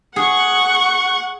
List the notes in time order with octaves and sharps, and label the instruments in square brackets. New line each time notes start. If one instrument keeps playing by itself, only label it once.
[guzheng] G#4 [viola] F#5 C#6